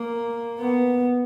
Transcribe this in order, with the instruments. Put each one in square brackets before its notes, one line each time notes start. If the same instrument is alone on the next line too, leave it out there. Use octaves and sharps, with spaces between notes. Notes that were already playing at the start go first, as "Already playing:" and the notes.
Already playing: [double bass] A#3
B3